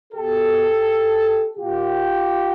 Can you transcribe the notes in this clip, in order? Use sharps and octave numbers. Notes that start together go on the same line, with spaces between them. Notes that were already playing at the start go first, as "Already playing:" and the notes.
B2 G4 A4
A#2 F4 G4